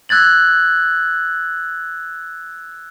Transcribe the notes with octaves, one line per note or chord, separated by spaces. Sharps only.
E6 F#6 G#6 A6 F#7